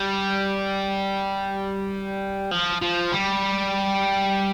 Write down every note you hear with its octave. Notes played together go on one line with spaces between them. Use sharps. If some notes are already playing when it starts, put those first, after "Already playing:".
Already playing: G3
F3
F3
G3